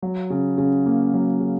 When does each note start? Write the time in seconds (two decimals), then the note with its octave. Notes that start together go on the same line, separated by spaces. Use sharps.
0.02 F#3
0.30 C#3
0.58 C#3
0.86 A#3
1.14 F#3
1.41 C#3